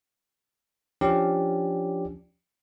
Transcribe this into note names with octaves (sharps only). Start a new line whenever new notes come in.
F3 C#4 D4 G4 D5